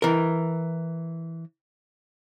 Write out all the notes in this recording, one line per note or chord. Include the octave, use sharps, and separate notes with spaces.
E3 A#4